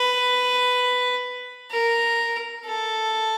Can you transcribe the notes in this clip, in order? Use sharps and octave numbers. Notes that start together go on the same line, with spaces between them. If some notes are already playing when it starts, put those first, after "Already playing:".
Already playing: B4
A#4
A4